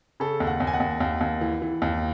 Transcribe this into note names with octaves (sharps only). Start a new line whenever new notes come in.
C#3 A4
D#2
F#5
D#2
G#5
F#5
D#2
D#2
D#2
E3
E3
D#2